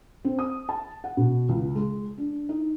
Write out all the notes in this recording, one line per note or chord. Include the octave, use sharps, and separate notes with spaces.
C4
D#6
A5
F#5
B2
C#2
G#3
D4
D#4